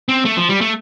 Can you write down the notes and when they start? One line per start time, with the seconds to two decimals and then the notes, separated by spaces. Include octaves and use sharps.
0.09 C4
0.25 A3
0.37 F3
0.49 G3
0.61 A3